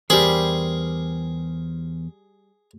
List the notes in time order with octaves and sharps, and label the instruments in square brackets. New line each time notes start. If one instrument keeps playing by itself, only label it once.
[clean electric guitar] E2 A#4 C5 [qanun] G3 B5 [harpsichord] G#4